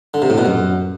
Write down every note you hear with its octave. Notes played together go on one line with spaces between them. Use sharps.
D3
C3
A2
B2
F#2